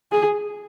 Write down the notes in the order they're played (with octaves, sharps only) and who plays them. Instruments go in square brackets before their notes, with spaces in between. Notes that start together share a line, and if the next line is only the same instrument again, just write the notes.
[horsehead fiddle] G#4